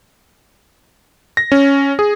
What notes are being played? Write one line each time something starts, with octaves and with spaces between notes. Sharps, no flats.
A#6
C#4
G#4